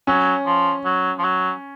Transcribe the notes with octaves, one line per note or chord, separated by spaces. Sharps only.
F#3 C#4
F3
F#3
F3
F#3